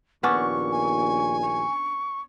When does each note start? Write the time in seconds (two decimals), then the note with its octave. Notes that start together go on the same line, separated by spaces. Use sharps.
0.23 A#1 D#2 A#2 B3 C#4 D4 C#6
0.72 G#5
1.43 C#6